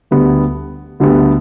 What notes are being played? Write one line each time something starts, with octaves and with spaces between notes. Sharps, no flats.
D2 D3 G3 B3
D2 D3 G3 B3